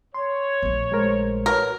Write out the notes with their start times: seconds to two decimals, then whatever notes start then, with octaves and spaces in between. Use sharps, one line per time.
0.14 C#5 C6
0.63 A#1 A3
0.92 G#3 A#4 C5
1.46 F#4 A#4 B4 C#5